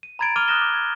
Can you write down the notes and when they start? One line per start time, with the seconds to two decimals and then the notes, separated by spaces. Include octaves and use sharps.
0.03 D#7
0.19 A#5 B5 G#6 A6 D7
0.36 D6 F6 A6 D#7 F7 G7
0.48 D#6 F#6 A6 A#6 E7 G7
0.62 D6
0.74 G#6